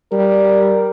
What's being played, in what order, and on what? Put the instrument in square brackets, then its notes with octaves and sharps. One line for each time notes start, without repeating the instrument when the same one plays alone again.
[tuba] G3 [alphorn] A#4